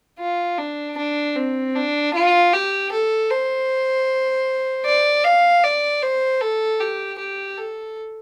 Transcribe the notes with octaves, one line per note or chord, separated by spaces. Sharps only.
F4
D4
D4
C4
D4
F4
G4
A4
C5
D5
F5
D5
C5
A4
G4
G4
A4